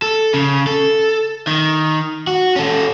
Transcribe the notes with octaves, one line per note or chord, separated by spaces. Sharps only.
A4
C#3
A4
D#3
F#4
C#4 A4